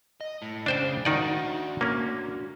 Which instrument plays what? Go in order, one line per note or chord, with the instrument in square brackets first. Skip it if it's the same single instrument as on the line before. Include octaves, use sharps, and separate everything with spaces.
[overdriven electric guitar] D#5
A2
[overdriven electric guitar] C#3 [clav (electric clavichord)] D4 C5 G5
[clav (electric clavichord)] D#3 D#4 D5 [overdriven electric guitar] D4 F#4
[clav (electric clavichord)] A#3 C#4